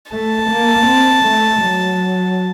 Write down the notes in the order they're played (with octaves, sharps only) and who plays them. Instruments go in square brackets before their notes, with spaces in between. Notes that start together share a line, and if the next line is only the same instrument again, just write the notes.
[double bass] A3 [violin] A5
[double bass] A#3
C4
A3
F#3